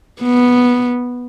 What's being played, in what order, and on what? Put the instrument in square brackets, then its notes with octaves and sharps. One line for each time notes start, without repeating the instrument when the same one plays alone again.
[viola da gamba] B3